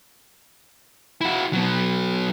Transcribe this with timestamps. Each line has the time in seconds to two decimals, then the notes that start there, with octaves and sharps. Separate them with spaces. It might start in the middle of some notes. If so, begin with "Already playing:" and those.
1.21 E4 F#4
1.53 F#3 B3